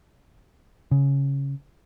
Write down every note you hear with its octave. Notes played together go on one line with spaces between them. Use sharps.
C#3